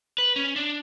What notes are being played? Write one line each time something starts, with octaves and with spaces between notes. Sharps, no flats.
B4
C#4
D4